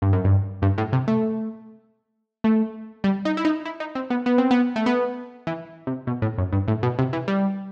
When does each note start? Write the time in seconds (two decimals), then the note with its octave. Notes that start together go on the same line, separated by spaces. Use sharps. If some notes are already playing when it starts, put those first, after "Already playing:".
0.02 G2
0.13 F#2
0.24 G2
0.62 G2
0.78 A2
0.93 C3
1.08 A3
2.44 A3
3.04 G3
3.25 D#4
3.37 E4
3.45 D#4
3.65 E4
3.80 D#4
3.95 C4
4.10 B3
4.26 B3
4.38 C4
4.51 B3
4.76 A3
4.86 B3
5.47 E3
5.87 C3
6.07 B2
6.22 A2
6.38 F#2
6.53 G2
6.68 A2
6.83 B2
6.99 C3
7.13 E3
7.28 G3